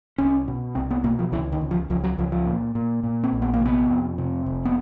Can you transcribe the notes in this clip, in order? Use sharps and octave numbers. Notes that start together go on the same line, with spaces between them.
C2 C#4
B2
C2 C4
B3
B2 A#3
F3
C#2 E3
D#3
C#2
F3
C#2 F3
F#3
C#2 F3
F3
A#2
A#2
A#2
C4
A#1
B3
A#3
C3 B3
F2
C3
F1
B3